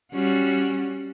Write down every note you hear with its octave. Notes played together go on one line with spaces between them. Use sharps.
G3 C#4 F#4